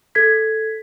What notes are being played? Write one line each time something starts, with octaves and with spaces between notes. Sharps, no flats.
A4 G#6 B6